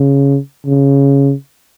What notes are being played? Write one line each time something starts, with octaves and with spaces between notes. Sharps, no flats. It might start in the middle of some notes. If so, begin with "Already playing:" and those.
Already playing: C#3
C#3